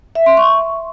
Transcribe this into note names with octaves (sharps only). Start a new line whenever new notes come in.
E5
C6
C#6